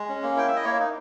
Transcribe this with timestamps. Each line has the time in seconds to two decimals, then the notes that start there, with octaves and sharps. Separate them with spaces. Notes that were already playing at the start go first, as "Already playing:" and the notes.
Already playing: G#3
0.09 C#4
0.23 A#3
0.36 E4 G5
0.48 E4 E5
0.56 D#5
0.65 A#3 C#5
0.80 D#4